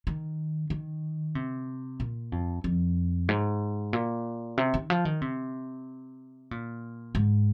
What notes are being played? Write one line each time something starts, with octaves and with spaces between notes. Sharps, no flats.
D#3
D#3
C3
A#2
F2
F2
G#2
A#2
C3
D#3
F3
D#3
C3
A#2
G#2